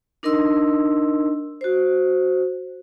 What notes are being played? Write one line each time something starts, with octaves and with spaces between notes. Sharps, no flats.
D4 D#4 A#4 D#5 C6 E6
F#4 C5